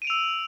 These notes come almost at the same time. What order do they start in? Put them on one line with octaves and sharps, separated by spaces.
D#7 D7 F7 E6